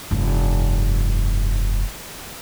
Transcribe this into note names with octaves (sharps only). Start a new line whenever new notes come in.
F1 G2